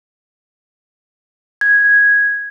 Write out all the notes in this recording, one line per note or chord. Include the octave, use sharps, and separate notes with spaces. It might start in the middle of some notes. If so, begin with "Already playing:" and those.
G#6